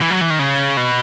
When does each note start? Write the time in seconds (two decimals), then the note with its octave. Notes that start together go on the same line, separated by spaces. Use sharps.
0.01 E3
0.11 F#3
0.21 E3
0.30 D#3
0.39 C#3
0.77 B2